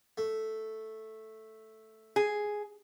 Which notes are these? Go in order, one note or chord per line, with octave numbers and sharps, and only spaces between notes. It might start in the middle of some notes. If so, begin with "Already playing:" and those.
A3
G#4